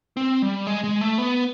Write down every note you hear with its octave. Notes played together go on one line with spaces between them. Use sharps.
C4
G3
G#3
G#3
A3
B3